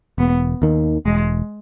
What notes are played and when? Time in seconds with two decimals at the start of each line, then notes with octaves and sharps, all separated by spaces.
0.18 E1 B3
0.62 D#2 D#3
1.05 E1 G#3